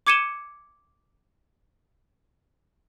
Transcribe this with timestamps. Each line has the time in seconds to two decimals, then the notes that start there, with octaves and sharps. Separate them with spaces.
0.07 D6 G#6 C#7 D#7 E7 G7